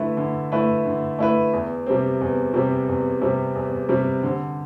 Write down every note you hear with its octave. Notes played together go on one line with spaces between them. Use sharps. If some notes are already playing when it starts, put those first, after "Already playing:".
Already playing: D3 A3 E4 B4
D3
A3 E4 B4
D3
A3 E4 B4
E2
C3 G3 C4
E2
C3 G3 C4
E2
C3 G3 C4
E2
C3 G3 C4
D3